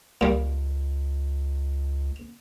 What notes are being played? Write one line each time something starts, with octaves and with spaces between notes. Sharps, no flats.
C#2 A#2 G3